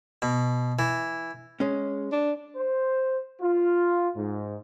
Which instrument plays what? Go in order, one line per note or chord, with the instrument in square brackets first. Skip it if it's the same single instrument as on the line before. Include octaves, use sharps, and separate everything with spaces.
[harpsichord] B2
E3
[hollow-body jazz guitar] G#3 C#4
[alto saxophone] D4
[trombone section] C5
F4
G#2